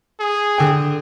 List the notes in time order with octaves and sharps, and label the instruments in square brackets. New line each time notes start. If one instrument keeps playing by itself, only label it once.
[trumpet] G#4
[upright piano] D3 G5